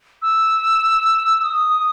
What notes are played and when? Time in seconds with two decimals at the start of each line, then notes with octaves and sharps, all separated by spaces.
0.22 E6
1.43 D#6
1.74 D#6